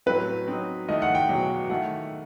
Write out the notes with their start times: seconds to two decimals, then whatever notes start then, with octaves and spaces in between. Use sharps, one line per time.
0.06 A2 F#3 C4 B4
0.47 F#3 C4 D#4
0.88 D#3 A3 E4 D#5
1.02 F#5
1.15 G5
1.29 E2 B2 F#3
1.70 D#3 A3 E4 F#5